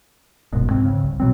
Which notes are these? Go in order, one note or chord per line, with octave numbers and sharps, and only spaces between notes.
F#1 C2 G#2 B2
G#2 C4
C#3
C2
B2 F#3 C4